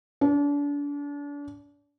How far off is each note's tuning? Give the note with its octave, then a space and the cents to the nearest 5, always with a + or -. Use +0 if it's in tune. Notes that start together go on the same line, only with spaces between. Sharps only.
D4 -35